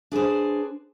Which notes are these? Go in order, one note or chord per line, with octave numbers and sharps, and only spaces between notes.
D4 G#4 B4 C5